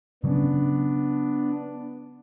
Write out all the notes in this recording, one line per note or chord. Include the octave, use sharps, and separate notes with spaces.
C#3 F#3 B3 C#4 D4